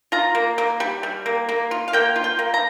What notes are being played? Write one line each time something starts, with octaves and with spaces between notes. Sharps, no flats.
F4 A#5
A#3
A#3
G3
G3
A#3
A#3
F4
F5
A#3 G5
F4
G5
A#3
A#5